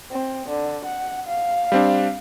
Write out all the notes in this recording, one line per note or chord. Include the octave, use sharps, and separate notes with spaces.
C4
D3
F#5
F5
G3 C4 D4